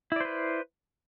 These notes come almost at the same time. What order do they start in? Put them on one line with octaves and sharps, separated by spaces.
E4 D5 C5 B4